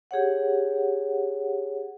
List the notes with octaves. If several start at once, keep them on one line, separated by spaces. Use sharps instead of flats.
G4 G#4 C#5 F#5